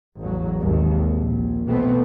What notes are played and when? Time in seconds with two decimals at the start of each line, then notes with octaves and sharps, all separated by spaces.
0.21 A1 E2 F#3
0.61 G#1 D#2
1.15 A#1
1.67 B2 E3 A3 B3 C4